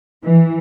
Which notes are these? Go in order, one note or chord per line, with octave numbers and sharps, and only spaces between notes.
E3